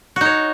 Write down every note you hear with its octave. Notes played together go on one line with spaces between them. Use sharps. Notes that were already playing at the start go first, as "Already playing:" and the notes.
D#4 F#4 C#5